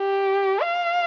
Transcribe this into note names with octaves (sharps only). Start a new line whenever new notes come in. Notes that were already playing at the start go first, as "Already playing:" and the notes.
Already playing: G4
F5